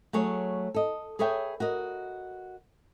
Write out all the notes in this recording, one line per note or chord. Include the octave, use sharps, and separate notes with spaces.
F#3 A3 G#4 C#5
A4 D#5
G#4 A4 B4 C#5 E5 G5
F#4 A#4 D#5